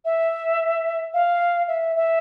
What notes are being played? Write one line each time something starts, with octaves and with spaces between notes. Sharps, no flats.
E5
F5
E5
E5